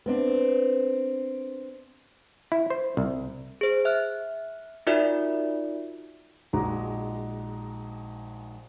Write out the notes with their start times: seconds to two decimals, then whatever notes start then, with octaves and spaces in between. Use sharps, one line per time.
0.06 B3 C4 D4
2.52 E4
2.70 C5
2.97 C2
3.61 G#4 C5
3.85 E5 F6 F#6
4.87 D#4 F4 F#4 A#4 D5 E5
6.53 A#1 G#3 D#4 F#4 A#5 D6